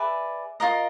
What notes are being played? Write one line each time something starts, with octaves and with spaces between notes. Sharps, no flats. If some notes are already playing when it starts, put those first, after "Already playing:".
Already playing: G#4 B4 D5 E5
F4 A#4 D#5